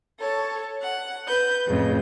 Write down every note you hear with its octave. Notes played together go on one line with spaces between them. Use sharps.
A4 C#5
F#5
B4 G6
F2 A2 C#3